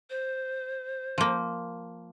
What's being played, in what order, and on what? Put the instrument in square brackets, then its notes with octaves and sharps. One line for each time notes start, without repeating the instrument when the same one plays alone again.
[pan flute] C5
[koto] F3 A#3